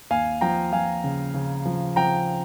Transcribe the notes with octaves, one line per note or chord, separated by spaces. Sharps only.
D#2 F5 G#5
F3 G5 A#5
F3 F5 G#5
C#3
C#3
F3
F3 G5 A#5